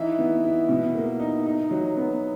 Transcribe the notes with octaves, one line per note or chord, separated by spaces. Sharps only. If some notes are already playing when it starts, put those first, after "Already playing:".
Already playing: E3 D#4 E5
B3
E4
B2
A#3
D#4
D#4
F#3
B3